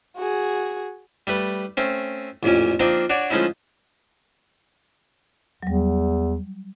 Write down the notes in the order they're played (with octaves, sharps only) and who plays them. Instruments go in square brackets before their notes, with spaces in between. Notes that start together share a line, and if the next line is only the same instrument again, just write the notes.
[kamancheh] F#4 G#4
[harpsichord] G3 A3 B4
A3 C4 C#4
A1 F2 A#2 C#4
F3 A#3 C4 D4 D#4
D4 F#4 C#5 D5
F3 G#3 A3 C#4 D#4 E4
[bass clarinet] E2 [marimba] F#3 G3